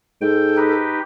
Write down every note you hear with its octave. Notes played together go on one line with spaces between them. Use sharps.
G#2 A4 G5
D#4 G4 B4